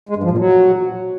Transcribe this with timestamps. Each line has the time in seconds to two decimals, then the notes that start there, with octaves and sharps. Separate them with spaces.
0.09 G#3
0.16 G2
0.24 F3
0.31 A#2
0.38 F#3